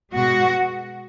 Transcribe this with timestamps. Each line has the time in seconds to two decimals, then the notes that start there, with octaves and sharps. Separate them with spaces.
0.14 B2 G#3 B3 F#4